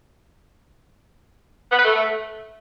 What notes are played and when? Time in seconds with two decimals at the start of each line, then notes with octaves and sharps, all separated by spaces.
1.72 B3
1.78 B4
1.85 A3